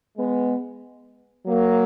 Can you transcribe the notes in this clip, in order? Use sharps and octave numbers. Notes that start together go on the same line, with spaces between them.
G#3 B3
F#3 A#3